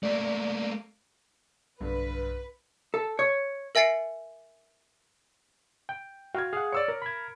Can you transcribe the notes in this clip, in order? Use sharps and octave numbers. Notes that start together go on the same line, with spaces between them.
A3 A#3 D5
B1 G2 D3 B4
A4
C#5
A#4 E5 G#5 A6 C7 C#7
G5
F#4 F5 G5 F6 G#6
G#4 F5 F#5
C#5 D5 E6 C#7
A#4
B5 G#6